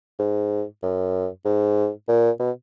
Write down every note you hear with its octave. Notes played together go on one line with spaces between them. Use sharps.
G#2
F#2
G#2
A#2
B2